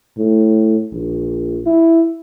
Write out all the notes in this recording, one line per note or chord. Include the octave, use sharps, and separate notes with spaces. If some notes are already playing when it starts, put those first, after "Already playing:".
A2
A#1
E4